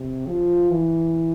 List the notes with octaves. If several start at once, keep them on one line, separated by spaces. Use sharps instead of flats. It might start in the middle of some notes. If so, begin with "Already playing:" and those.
Already playing: C3
F3
E3